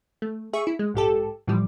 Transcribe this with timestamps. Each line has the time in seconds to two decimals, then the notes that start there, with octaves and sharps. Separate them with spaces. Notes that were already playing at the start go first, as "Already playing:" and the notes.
0.22 A3
0.53 G#4 E5 C#6
0.67 E4
0.79 G#3
0.94 A#1 G#2 G4 A4
1.47 A2 E3 F3 G3